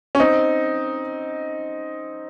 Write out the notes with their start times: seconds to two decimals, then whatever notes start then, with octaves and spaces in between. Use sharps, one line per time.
0.15 C#4
0.20 C4 D#4